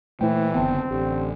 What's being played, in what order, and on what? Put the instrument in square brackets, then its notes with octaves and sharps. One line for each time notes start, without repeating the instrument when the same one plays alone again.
[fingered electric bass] A#2 A3 [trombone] E3 [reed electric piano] E4 C5 G5
[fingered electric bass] F#1 D3 B3 [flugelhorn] C4 [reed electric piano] G5 A5
[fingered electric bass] A1 [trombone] D3 [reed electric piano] G4